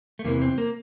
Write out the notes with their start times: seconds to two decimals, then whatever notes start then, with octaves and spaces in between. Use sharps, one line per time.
0.19 A3
0.24 E2 C3 E3 A#3
0.42 C4
0.58 A#3